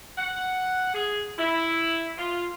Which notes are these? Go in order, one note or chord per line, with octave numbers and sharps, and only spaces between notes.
F#5
G#4
E4
F4